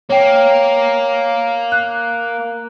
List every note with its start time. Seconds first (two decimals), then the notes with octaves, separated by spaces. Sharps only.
0.10 A#3 C#5 G5
1.72 F#6